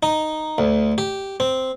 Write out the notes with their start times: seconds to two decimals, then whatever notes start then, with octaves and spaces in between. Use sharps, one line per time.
0.03 D#4
0.58 D2
0.98 G4
1.40 C4